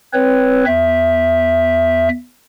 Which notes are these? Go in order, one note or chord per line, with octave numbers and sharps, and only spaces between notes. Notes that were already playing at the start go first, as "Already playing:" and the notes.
C4 B4 C#5
E2 E5